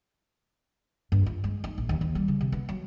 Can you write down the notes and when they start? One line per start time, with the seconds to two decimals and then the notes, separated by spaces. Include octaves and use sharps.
1.12 G2
1.26 F4
1.44 G#3
1.64 D#4
1.78 A#1
1.89 D#2
2.01 D#2
2.15 G3
2.28 C#3
2.41 C3
2.52 B3
2.69 F#3